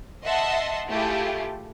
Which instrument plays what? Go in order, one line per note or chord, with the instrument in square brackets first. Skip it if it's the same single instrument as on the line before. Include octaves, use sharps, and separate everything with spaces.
[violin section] D#5 E5 F#5 A5 C6
A3 E4 F4 G4 G#4